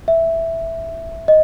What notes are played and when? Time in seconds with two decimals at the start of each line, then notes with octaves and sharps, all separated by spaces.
0.08 E5
1.28 D#5